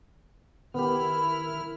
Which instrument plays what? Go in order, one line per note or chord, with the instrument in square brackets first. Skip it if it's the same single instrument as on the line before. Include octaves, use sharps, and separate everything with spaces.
[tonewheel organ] D#3 A#4 [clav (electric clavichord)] B3 G4 [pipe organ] E4 F6 [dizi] B5